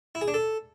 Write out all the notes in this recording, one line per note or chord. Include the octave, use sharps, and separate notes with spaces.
E4
G#4
D4
A4